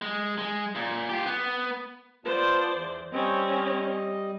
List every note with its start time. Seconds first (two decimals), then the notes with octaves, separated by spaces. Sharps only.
0.02 G#3
0.38 G#3
0.75 A#2
1.09 F4 G4
1.26 B3
2.25 B3 F4 C5 D5 A5
2.72 E2
3.13 G3 C4 C#4 D#5